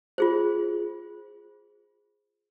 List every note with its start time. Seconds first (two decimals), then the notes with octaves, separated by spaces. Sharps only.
0.18 F4 G#4 C5